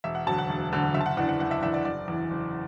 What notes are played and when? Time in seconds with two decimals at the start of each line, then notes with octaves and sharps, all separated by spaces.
0.04 E1 E5
0.15 F#5
0.27 D2 D3 F#3 A5
0.38 F#5
0.49 E1
0.72 D2 D3 F#3
0.94 F#1 E5
1.01 A5
1.06 F#5
1.17 E2 E3 D4 F#5
1.29 F#5
1.39 F#1 F#5
1.51 E5
1.62 E2 E3 D4 E5
1.74 D5
1.85 F#1 D5
2.08 E2 E3
2.30 F#1